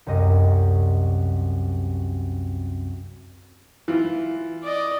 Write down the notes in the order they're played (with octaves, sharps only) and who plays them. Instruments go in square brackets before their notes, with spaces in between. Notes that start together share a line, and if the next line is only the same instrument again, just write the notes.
[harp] C2 F#2 G3 D#5 A#6
[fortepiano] E3 F4
[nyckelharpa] D5 D#5